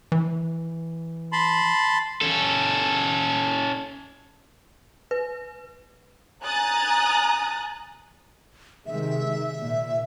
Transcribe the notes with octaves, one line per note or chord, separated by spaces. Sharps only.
E3
A5 B5 C6
C#4 A4
B4
G#5 A#5 D#6 F#6 A6
C3 D#3 G#3 E5
A#2